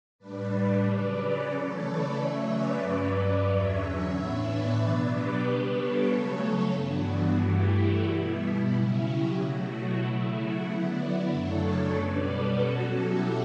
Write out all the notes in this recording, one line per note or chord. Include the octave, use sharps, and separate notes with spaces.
A2 G3 D4 B4 D5
B4 D5
C#3 F#3 C#4
B4 D5
C#3 E3 A3 A4 C#5
B4 D5
C#3 F#3 A3 C#4 C#5 E5
B4 D5
G2 F#3 C#4
B4 D5
E2 D3 F#3 C#4 C#5 E5
C#5 E5
A2 E3 B3 D4
B4 D5
B2 F#3 B3 D4
G4 B4
C#3 G3 B3 D4
A4 C#5
C#3 F#3 A3
G2 E3 B3 D4 F#4
F#4
G2 E3 A3 E4 G4
F#4
B2 G3 B3 E4
C#3 F#3 C#4
E4 G4
B2 F#3 A3 F#4
E4
C#3 F#3 A3
F#4
D3 F#3 B3 D4 E4
F#2 C#3 F#3 A3 D4 A4 C#5
A4 C#5
B2 G3 C#4 B4 D5
F#4 A4
B2 F#3 C#4
E4 G4